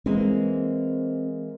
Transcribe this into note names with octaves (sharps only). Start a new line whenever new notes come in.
E3 G#3 A#3 C4